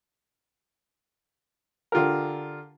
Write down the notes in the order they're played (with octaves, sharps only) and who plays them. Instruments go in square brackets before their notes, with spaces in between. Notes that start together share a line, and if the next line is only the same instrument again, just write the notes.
[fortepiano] D3 F4 G4 A#4